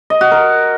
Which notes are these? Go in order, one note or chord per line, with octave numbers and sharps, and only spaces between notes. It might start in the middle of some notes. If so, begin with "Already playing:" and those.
D#5
F#4
A#4